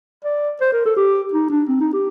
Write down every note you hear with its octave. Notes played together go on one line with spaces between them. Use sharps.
D5
C5
A#4
A4
G4
D#4
D4
C4
D#4
G4